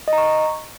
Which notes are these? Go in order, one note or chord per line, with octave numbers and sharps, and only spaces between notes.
D#5
A#5
C#6